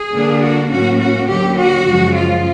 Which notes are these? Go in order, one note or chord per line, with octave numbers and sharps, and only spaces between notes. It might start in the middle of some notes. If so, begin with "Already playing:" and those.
Already playing: G#4
D3 G3 A#3 D4
F#4
A2 F#3 A#3 C#4 F#4
F#4
D#2 D3 F#3 G4
F#4
F#2 C#3 F3 G#3
F4